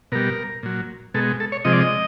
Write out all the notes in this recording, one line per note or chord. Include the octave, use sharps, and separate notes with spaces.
B2 G3 A#4
A#2 F#3
B2 G#3 A4
A4
C#5
C3 F3 G#3 D#5
D5
D#5